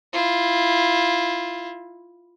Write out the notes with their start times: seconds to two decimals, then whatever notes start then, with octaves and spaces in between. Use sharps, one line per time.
0.13 E4 F4